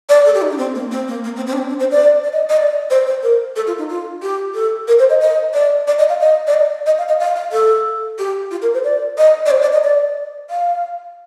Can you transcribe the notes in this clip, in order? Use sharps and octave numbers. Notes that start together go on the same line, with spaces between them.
D5
A4
G4
D#4
D4
C4
A#3
C4
A#3
A#3
C4
C4
D4
C4
D4
C5
D5
D5
D#5
D#5
D5
C5
C5
A#4
A4
F4
D#4
F4
G4
A4
A#4
C5
D#5
D#5
D5
D5
D#5
F5
D#5
D5
D#5
D#5
F5
D#5
F5
F5
A4
G4
F4
A#4
C5
D5
D#5
D5
C5
D5
D#5
D5
F5